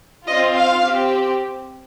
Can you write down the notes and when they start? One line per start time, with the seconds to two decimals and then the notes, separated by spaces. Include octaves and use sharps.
0.26 C4 F4 D#5
0.55 F5
0.85 C4 G4